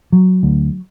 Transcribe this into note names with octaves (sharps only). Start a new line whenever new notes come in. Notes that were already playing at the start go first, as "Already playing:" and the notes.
F#3
D2